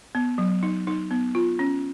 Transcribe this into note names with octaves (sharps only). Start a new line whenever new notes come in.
B3
F#3
D#4
D#4
B3
F4
C#4